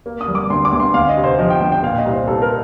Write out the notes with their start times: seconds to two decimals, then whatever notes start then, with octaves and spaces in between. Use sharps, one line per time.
0.06 A#3
0.21 D#6
0.28 G3
0.35 D6
0.50 D2 C6
0.65 D6
0.73 D2
0.80 C6
0.94 D2 F5
1.09 D#5
1.17 C3
1.24 C5
1.39 F3 D#5
1.50 G5
1.61 D2 G5
1.72 G5
1.83 A#2 F5
1.98 D#5
2.05 C2
2.13 C5
2.27 C2 A4
2.42 A#4